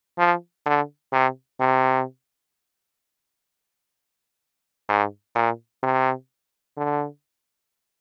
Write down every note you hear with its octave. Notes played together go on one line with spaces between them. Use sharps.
F3
D3
C3
C3
G#2
A#2
C3
D3